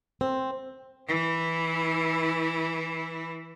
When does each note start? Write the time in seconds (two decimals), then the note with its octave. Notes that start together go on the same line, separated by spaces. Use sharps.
0.21 C4
1.09 E3 E4